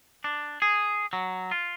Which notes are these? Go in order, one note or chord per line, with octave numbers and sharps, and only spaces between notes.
D4
G#4
F#3
F4